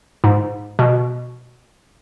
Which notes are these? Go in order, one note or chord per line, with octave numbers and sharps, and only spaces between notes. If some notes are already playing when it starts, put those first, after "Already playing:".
G#2
B2